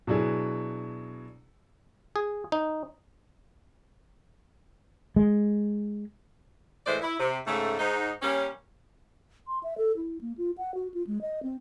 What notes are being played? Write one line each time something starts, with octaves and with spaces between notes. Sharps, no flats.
B2 F#3 D4 E4 G#4
G#4
D#4
G#3
A2 E3 G#3 C5 D5
E4
C3
G#2 C#3 A3
G#2 D#4
G3 A#3 C#4
C6
E5
A4
E4
A#3
F4
F#5
F#4
F4
G#3
D#5
C4